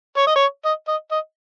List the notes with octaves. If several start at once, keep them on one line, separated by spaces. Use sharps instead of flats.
C#5
D#5
C#5
D#5
D#5
D#5